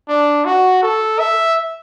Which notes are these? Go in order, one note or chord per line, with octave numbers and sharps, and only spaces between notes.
D4
F#4
A4
E5